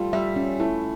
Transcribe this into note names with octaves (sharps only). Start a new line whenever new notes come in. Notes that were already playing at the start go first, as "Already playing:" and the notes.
Already playing: G3 A3 F4
G3 E5
C#4
A3 E4